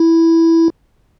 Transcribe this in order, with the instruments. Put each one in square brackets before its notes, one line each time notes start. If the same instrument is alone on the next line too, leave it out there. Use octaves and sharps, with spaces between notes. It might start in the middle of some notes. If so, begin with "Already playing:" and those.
Already playing: [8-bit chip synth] E4